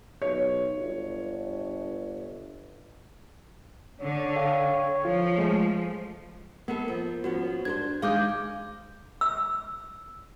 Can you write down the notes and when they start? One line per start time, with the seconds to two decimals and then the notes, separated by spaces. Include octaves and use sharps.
0.22 B1 C#5
0.77 G1
4.01 D3 C#5
4.36 A4 F5 G5
5.05 F3 F4
5.38 G#3 A3
6.68 A#3 B3 A4 A#4
6.88 F3
7.24 F3 B3 C#4 F#4
7.65 D4 A#4 C5 G#6
8.02 D#3 G#3 D#4 F5 D6 G6
9.21 E6